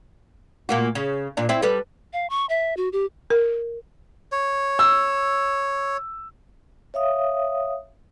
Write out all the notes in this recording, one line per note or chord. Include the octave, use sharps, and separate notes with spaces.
A#2 A#3 F#4
C#3
A#2 D4
C4 E4
G3 A4 B4
F5
C#6
E5
F#4
G4
A#4
C#5
E6
C#5 E5 F5 D#6